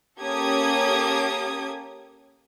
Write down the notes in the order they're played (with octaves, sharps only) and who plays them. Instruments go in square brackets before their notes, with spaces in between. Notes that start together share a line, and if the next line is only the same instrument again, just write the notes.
[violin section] A#3 C#4 G4 A4 D#6 G#6